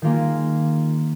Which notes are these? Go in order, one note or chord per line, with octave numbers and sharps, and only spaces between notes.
D#3 A#3 F4 G#4